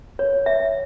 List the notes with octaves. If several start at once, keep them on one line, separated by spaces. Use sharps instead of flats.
C#5
E5